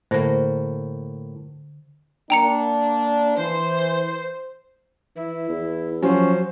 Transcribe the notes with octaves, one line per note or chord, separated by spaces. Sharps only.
A2 D3 A#3 C5 A#6
A#3 D4 G5 A#5 C#7
E3 C5
E3 E4
E2
F3 F#3 C#4 C5